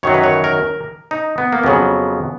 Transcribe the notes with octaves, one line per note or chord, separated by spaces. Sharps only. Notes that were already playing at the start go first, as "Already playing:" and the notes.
F#2 D#3 F#3 C#5
B4
C#5
A#4
D#4
B3
A#3
F2 C#3 F#3 B3